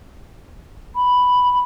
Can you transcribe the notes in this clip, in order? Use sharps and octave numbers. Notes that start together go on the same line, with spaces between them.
B5